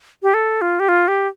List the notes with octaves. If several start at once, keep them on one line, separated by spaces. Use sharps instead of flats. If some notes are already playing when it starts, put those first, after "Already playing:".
G4
A4
F4
G4
F4
G4